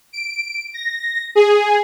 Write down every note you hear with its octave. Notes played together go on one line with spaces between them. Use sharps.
D7
A#6
G#4